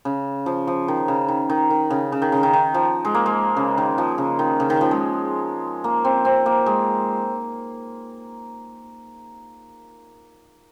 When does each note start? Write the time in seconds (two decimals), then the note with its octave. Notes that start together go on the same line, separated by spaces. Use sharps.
0.05 C#3
0.46 F3
0.67 F3
0.88 D#3
1.08 C#3
1.28 D#3
1.50 D#3
1.70 D#3
1.90 C#3
2.12 C#3
2.22 D#3
2.32 C#3
2.43 D#3
2.53 D#3
2.74 F3
3.05 G#3
3.15 A#3
3.26 G#3
3.57 C#3
3.78 D#3
3.98 F3
4.18 C#3
4.39 D#3
4.60 C#3
4.70 D#3
4.81 F3
4.91 G#3
5.84 A#3
6.04 C4
6.25 C4
6.46 A#3
6.66 G#3